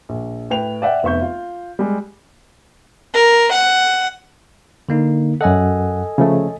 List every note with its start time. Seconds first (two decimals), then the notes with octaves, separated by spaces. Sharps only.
0.09 A#1
0.50 A2 B4 G5 F7
0.82 D5 E5 F#5 G5
1.03 F1 B3 E5 C#6 G6
1.21 F4 F5
1.79 G3 G#3
3.13 A#4
3.53 F#5
4.89 D3 A#3 D#4
5.41 F#2 A4 D#5 F#5 G#5
6.18 C#3 F3 A3